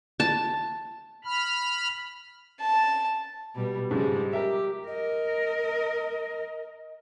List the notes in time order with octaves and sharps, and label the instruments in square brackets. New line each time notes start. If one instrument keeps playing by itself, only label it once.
[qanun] A5
[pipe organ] B5 F6
[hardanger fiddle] A5
[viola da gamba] B2 G3
[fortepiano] G#2 C#3 F3 [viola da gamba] G3 G#3
[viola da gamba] G4 [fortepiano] A#4 E5
[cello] A#4 [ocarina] D#5